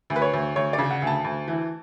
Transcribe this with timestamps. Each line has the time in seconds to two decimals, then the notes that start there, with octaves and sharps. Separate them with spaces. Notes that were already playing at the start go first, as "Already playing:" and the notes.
0.10 D2
0.16 B4
0.22 C#5
0.33 D2
0.56 D2 C#5
0.73 D5
0.78 C#3
0.90 F#5
1.02 D2
1.07 A5
1.24 D2
1.48 E3